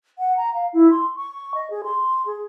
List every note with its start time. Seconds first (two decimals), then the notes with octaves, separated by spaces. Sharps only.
0.19 F#5
0.37 A#5
0.54 F5
0.73 E4
0.91 C6
1.16 C#6
1.55 D#5
1.70 G#4
1.84 C6
2.26 G#4